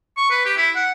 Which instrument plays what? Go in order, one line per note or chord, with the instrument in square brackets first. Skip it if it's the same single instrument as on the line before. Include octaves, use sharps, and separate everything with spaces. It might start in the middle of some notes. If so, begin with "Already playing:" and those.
[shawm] C#6
B4
G4
E4
F#5